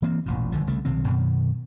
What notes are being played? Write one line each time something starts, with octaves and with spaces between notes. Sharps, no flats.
E3 A#3 C4
E1 A1 A#2
G1 D3 F3
C2 C#3 A3
B1 C3 D#3 C4
F#2 B2 D#3